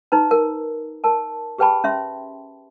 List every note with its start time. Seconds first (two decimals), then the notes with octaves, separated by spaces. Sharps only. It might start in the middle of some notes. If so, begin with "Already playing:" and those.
0.12 D#4 B4 A#5
0.31 A#4
1.04 A#4 A5
1.58 G4 G#4 B4 G5 A5 B5
1.84 C#4 E5 C6